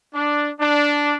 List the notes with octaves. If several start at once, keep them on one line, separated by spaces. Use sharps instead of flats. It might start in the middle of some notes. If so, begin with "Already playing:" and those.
D4
D4